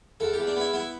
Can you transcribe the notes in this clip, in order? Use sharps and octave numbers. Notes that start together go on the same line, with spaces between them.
E2 A4
G4
E2
D4
B3 E4
B3 E4